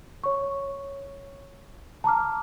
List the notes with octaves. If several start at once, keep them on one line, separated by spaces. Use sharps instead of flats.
C#5 C#6
A5 A#5 D6 F6